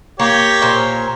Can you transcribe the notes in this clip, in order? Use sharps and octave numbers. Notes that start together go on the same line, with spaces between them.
A#3 G4 C#5
A#2 A#4 C5